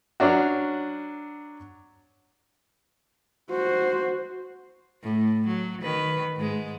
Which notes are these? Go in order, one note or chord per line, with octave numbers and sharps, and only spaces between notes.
F#3 C#4 D4 F#4
F#4 C5
A2
F#3
D#3 B4
G#2 G#3